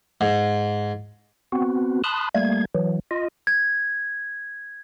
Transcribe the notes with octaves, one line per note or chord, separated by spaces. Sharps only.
G#2
B3 C4 F#4
A5 B5 C6 D#6 F#6
G3 A3 A#3 G#6
E3 F#3
F4 D#5
G#6